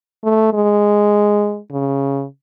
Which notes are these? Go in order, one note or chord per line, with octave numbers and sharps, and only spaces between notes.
A3
G#3
C#3